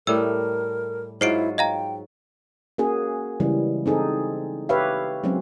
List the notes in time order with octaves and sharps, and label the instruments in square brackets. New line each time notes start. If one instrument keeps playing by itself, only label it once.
[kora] A2 G3 A3 [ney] A#4 [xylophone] E6
[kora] G#2 F#3 F4 [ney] E4 [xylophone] C5 C7 D7
[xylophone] D#5 F5 A#5 [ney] G5
[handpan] A#3 C#4 F#4 G#4
C#3 E3 G3 G#3 C#4
C4 D#4 G#4 A4
G4 B4 C#5 E5 F5
F#3 G#3 C4 C#4